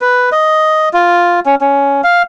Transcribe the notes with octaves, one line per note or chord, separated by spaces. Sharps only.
B4
D#5
F4
C#4
C#4
F5